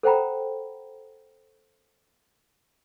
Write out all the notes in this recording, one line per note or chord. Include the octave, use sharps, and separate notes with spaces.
A4 C5 F#5 G5 A#5 B5